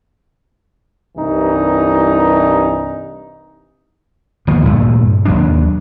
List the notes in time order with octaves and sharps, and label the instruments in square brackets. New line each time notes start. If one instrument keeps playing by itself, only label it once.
[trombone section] C2 G2 E3 D#4
[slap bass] G1 D#2 B2 F3
D2 G2 A#2 A3
D#2 F#3 D4